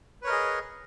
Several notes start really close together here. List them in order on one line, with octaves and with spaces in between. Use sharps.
B4 C#5 A#4 D#5 G#4